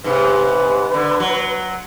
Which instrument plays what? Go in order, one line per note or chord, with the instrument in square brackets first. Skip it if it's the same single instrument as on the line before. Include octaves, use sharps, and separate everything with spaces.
[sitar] G#2 C3 [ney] B4
[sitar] D3
F#3